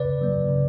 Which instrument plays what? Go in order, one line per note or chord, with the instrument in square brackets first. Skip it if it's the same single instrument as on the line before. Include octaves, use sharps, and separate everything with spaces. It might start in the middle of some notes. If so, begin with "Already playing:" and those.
Already playing: [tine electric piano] C#3 B4 D5
F#3 A#3
C#3